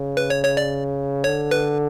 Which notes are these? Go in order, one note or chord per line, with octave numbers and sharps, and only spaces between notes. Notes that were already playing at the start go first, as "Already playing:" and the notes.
Already playing: C#3
B4
C#5
C#5
D5
D3 C#5
B4